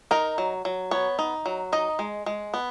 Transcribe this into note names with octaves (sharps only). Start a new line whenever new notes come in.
D#4 A#4
F#3
F#3
B3 C#5
D#4
F#3
D#4 D#5
G#3
G#3
B3